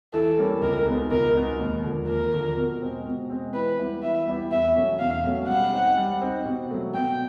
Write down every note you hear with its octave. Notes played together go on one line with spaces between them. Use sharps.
E3 A4
G3 A#3 C#4
C#2 A#4
B2 G#3 B3 D#4
C#2 A#4
B2 G#3 B3 D#4
D#2
D3 F3 A#3
D#2 A#4
D3 F3 A#3
B2
G#3 C4
B2
G#3 C4
E3 B4
G3 B3 E4 G4
E3 E5
G3 B3 E4 G4
E2 E5
B2 F#3 A3 C#4
E2 F5
B2 F#3 A3 C#4
G3 F#5
C4 D#4
G3
C4 D#4
B2
F#3 A3
B2 G5